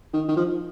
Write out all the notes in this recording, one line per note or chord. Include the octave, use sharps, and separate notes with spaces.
D#3
D#3
F3